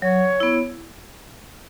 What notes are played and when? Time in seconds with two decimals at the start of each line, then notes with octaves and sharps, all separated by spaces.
0.02 F#3 C#5
0.40 B3 E4